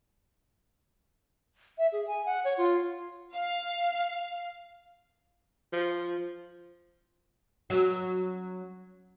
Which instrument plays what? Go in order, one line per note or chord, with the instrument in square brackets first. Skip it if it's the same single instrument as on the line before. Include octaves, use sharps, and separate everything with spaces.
[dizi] E5
G#4
G#5
F#5
C#5
F4
[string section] F5
[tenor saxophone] F3
[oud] F#3 C#4